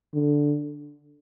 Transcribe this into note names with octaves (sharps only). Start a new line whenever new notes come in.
D3